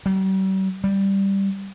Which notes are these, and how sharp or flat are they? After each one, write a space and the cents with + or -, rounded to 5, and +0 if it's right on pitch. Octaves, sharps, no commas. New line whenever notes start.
G3 -45
G3 +0